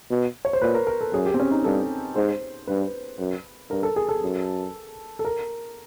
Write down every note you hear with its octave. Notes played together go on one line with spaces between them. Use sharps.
B2
C#5
C5
A#2 B4
A#4
A#4
A4
F#2 G#4
G4
C4
C#4
D#4
G2 A4
G#2 C5
G2 B4
F#2
G2 A#4
A4
G#4
A4
F#2
A4
A#4